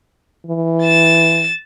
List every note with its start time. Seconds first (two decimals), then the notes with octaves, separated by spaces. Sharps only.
0.47 E3
0.83 A6 E7